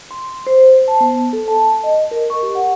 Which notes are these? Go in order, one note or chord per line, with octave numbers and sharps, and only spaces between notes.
C6
C5
A5
B3
A4
A5
D#5
A#4
C#6
G4
F#5